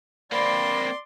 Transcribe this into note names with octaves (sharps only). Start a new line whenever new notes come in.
A#3 C4 D5 B5 C6